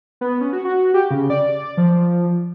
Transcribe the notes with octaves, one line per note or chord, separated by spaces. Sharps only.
B3
C#4
F#4
F#4
G4
C#3
D5
F3